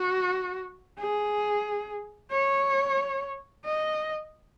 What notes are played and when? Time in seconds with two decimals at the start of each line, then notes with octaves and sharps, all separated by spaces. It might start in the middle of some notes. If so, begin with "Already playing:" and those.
Already playing: F#4
0.98 G#4
2.31 C#5
3.65 D#5